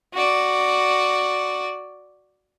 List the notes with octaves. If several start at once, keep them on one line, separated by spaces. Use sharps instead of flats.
F#4 D5